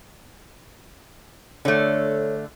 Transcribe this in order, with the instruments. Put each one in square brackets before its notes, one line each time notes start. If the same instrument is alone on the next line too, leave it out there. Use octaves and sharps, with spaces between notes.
[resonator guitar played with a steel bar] D3 A3 [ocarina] C#5